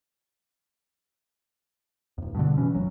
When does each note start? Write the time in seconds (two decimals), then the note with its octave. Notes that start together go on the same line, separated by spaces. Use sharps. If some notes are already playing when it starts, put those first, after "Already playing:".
2.18 D1 E2
2.35 G2 B2 D3
2.58 B2 E3 C#4
2.75 F#1 F#2 F#3